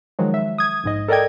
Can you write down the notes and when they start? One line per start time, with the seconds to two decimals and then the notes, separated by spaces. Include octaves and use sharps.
0.19 D#3 F3 F#3 G#3
0.34 E5
0.58 D#6 G#6
0.84 A#1 G#2 D#5
1.08 A4 A#4 D5 D#5 G5 G#6